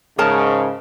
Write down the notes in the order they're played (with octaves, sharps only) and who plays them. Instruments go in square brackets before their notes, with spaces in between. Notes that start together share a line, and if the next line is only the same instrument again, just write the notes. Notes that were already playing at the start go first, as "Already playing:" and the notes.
[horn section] G#2 C#3 [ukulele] G#4 A#4 A5